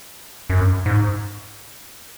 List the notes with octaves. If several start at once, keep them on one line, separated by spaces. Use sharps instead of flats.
F#2
G#2